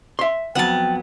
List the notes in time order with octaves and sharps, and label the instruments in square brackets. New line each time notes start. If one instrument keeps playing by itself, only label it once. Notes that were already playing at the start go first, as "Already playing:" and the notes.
[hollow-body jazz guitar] E5 C6
[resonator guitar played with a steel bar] F2 F#3 B3 [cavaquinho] F#5 A5 [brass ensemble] G5